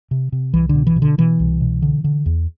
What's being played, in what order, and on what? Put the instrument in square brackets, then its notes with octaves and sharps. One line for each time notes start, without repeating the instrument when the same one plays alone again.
[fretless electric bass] C3
C3
C2 E3
D3
B2
E3
B2
D3
B2 E3
C2
B2
D3
D3
E2